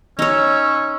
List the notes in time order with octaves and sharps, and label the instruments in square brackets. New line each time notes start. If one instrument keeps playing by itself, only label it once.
[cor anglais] C#4 [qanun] D#4 C#5 [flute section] E6